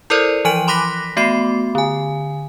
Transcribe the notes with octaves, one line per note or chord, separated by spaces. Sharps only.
E4 A4 A#4 C5 D5
E3 F3 G#5 D7 D#7 F#7
B5 C6 D6 F#6 A#6 B6
A3 B3 F#4 B5 C7
D3 G#5